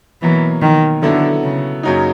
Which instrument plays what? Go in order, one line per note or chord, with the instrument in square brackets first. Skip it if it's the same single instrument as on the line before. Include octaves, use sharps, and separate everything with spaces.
[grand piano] B2 F#3 A#3 [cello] E3
[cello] D#3
[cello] D3 [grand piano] F#3 B3 E4 A4
[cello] C#3
[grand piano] F#2 C#3 F#3 A#3 D#4